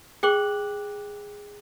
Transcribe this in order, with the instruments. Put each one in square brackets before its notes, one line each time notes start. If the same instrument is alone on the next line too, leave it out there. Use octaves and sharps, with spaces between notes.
[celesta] G#4 G5 D6 F#6 F#7